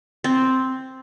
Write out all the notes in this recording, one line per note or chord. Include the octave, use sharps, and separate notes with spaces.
C4